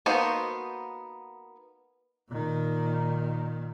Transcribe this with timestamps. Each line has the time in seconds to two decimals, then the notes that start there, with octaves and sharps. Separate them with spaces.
0.06 A#3 B3 D#4 F#4 C5
2.29 A#2 D#3